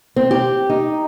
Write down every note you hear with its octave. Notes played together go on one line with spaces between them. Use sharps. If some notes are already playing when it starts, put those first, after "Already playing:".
C4
G4
D#4